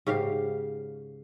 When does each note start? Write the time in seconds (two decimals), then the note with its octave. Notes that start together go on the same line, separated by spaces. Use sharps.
0.07 G#2 C#3 G4 F5